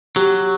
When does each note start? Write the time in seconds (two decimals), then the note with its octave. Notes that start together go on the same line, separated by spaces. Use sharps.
0.16 F#3 G4